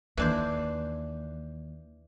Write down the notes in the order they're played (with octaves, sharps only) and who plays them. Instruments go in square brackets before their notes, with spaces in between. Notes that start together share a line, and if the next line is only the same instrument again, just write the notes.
[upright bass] D#2 [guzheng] E3 D4 C5